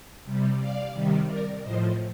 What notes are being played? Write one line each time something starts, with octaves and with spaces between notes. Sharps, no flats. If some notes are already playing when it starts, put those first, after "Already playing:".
C3 G3
D5 F5
C3 D#3 G3
A#4 D5
A2 F3 C5 D#5